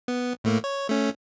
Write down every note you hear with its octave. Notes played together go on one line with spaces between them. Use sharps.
B3
A2 A3 A#3
C#5
A3 C#4